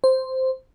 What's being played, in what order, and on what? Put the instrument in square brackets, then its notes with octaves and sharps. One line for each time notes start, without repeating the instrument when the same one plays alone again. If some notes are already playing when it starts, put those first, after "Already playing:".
[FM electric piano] C5